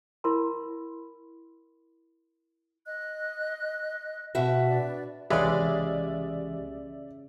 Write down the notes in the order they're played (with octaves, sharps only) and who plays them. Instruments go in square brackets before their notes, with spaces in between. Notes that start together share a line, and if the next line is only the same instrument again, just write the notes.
[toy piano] E4 A#4 B5 C6
[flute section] D#5 F#6
[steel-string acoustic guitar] B2 F#4 E5
[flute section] D4 B4 D5
[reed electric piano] C2 E3 G4 [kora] C#3 B4 [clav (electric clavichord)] G#3 [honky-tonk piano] D5 E5